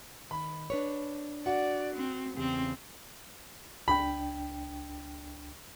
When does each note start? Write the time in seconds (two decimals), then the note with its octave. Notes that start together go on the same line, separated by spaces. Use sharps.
0.31 D#3 B5
0.70 D4 B4 C#5
1.46 F#4 D5 F#5
1.96 C4
2.37 E2 C#3 C4 G4
3.88 C#2 D4 G5 B5